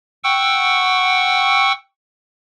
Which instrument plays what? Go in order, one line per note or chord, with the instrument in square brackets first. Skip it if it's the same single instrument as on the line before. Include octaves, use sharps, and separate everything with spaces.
[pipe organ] F#5 G5 C#6 E6